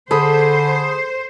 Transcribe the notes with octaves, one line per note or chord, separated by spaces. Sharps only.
D3 G#4 A4 C5 B5 D#6